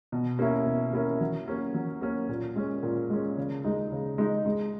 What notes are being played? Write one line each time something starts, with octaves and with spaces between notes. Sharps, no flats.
B2
A#3 C#4 E4 A#4
B2
A#3 C#4 E4 A#4
F#3
A#3 C#4
F#3
A#3 C#4
A#2
G#3 C#4
A#2
G#3 C#4
C#3
G#3 D#4
C#3
G#3 D#4
G#3